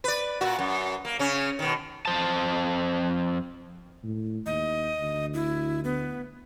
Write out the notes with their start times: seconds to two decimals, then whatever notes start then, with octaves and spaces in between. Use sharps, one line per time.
0.04 B4 D5
0.41 A#2 F#4
0.59 F#2
1.05 A#3
1.19 C#3 C#4
1.59 B2 D#3
2.06 F2 C5 A5
4.04 A2
4.46 D#2 D#5
4.99 D2
5.34 E4
5.84 B3